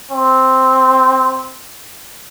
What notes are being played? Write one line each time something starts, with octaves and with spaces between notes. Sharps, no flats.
C4